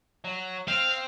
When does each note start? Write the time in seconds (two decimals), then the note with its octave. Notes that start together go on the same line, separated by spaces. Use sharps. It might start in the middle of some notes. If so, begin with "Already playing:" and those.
0.24 F#3
0.68 C4 F5